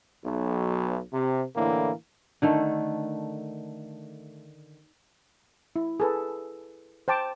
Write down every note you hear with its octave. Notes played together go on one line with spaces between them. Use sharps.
B1
C3
A2 D3 E3 A#3
D3 D#3 A3
E4
G#4 A4 B4
C5 G5 A5 D6